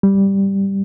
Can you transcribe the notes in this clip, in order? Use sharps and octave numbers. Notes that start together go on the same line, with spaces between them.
G3